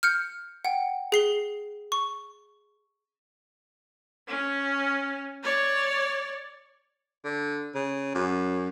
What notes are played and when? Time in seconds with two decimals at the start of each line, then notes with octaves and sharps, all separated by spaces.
0.03 F6 G6 C#7
0.65 F#5 G5
1.12 G#4 C7 G7
1.92 C#6
4.28 C#4
5.43 C#5 D5
7.25 D3
7.75 C#3
8.15 F#2